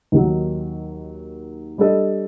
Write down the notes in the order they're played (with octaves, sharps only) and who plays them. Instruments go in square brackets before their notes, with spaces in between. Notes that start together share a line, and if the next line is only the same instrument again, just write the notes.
[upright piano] D#2 D#3 F#3
G3 D4 A4 D#5